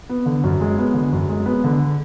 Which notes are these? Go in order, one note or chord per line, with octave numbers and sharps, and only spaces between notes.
B3
D3
F#2
G#3
B3
D3
F#2
G#3
B3
D3